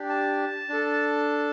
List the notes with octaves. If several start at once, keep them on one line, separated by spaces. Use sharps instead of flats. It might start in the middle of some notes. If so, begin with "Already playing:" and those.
Already playing: D4 G4
A5
D4 A4